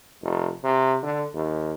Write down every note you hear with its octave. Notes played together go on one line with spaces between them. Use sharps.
F1
C3
D3
D#2